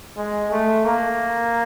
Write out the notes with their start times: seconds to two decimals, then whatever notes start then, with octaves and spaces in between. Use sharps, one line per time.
0.17 G#3
0.51 A3
0.85 A#3